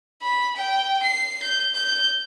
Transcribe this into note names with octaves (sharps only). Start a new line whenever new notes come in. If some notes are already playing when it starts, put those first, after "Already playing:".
B5
G5
C7
G6
G6